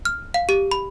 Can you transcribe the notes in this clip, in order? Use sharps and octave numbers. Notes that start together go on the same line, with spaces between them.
F6
F5
G4
B5